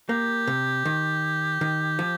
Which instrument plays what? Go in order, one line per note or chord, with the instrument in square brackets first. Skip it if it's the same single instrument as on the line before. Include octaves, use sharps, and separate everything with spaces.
[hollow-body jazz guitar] A#3 [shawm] G4
[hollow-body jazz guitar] C3
D#3
D#3
F3